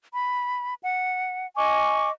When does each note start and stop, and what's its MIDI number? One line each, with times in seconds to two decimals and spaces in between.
0.14 0.74 83
0.83 1.45 78
1.56 2.10 75
1.56 2.10 80
1.56 2.10 85
1.56 2.10 86